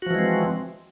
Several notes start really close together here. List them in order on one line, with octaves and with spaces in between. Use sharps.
F#4 F3 E3 G#3 C4